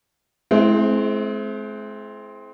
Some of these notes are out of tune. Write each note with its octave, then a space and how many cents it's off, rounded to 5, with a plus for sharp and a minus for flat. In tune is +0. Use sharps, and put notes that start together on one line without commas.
G#3 +40 C4 +0 E4 +0